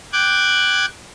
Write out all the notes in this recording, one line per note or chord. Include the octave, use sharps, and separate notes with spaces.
G5 D6 F#6 G#6